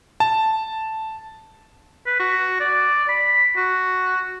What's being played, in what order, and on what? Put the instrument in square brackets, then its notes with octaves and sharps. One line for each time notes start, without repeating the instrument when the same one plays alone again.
[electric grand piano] A5
[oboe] B4
F#4
D5
B5
F#4